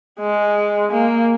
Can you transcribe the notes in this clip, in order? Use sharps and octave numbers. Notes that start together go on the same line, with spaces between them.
G#3
A#3